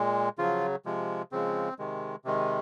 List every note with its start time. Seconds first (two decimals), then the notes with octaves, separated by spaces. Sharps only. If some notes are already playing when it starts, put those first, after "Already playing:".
Already playing: A#2 G#3
0.38 C#3 F3 F#3 F4
0.85 C3 F3 G#3
1.32 C#3 F3 G#3 C4
1.79 C3 D#3 G#3
2.25 C3 D#3 G#3